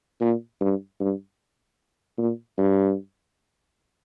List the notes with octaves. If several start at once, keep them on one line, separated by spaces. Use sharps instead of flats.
A#2
G2
G2
A#2
G2